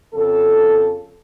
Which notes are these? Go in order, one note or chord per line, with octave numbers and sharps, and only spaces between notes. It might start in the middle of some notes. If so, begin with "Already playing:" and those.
F2 C#3 A4